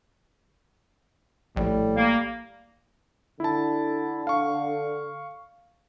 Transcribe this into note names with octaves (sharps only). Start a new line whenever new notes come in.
A#1 A2 G3
A#3
D3 E4 A5
F5 C#6